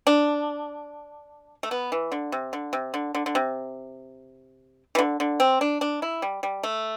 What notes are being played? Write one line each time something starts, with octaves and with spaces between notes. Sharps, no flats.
D4
A3
B3
E3
D3
C3
D3
C3
D3
D3
D3
C3
E3
D3
D3
C4
D4
D4
E4
G3
G3
A3